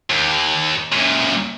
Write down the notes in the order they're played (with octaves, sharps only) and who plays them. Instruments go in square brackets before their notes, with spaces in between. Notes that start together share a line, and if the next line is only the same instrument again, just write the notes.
[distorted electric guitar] D#2
F#2 A#2